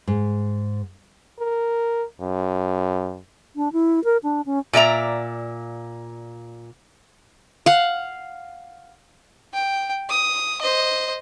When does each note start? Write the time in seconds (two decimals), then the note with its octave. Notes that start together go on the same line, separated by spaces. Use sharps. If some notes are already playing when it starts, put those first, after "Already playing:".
0.07 G#2
1.40 A#4
2.21 F#2
3.56 D4
3.73 E4
4.04 A#4
4.23 D4
4.46 C#4
4.73 A#2 D5 E5 A#5
7.66 F5 F#5
9.54 G5
10.09 D#6
10.62 C5 D#5